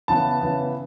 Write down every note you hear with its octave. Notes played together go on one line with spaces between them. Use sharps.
C#3 E3 B3 A5
C#3 E3 B3